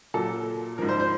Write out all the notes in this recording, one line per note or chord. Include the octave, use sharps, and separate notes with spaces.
A#2 F#3 A4
G#2 F3 A#4
C5
C5